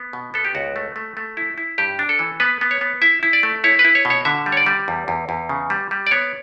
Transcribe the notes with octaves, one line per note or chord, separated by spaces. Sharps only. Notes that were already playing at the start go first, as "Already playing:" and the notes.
Already playing: B3
B2
B3 A4
G4
C#2 F#4
A3
A3
A3
E4
E4
G2 G4
D4
A4
E3
B3 B4
B3
C#5
B3
E4 E5
E4
D5
A3
E4 C#5
B4
E4
C#5
B2
C#5
D3 E5
G3
C#5
D5
G3
E2
E2
E2
C#3
G3
G3
D5
B3 C#5